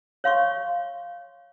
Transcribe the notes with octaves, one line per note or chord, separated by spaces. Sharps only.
C#5 F5 C6 C#6